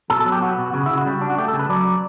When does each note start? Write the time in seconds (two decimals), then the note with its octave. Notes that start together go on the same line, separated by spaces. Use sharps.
0.10 B2 A4
0.20 A4
0.26 F#3
0.32 G4
0.42 B3 F#4
0.59 B2
0.73 C#3 F#4
0.86 C#3 E4
0.97 F#4
1.06 G3
1.21 D4
1.30 F#4
1.38 A3 G4
1.48 A4
1.53 C#3
1.59 B4
1.69 F#3 D5